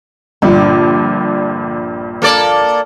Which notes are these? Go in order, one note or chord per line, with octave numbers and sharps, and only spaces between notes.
A#1 G2 A#2 D3
A#3 A4 D5